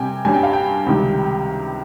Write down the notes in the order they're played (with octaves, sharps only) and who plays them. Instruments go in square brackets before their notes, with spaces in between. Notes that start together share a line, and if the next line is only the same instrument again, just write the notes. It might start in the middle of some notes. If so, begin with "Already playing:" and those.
Already playing: [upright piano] C3 G3 G5 G#5
G2 G3 C#4 G#5
G5
F5
G5
C#2 C3 D#3 G3